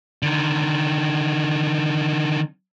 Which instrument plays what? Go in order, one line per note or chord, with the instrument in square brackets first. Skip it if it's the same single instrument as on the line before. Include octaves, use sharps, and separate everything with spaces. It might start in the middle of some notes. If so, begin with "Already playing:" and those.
[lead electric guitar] D3 D#3